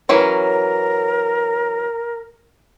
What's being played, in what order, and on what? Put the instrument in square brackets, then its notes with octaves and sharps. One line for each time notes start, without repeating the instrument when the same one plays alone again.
[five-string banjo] E3 F#3 C#4 [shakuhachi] A#4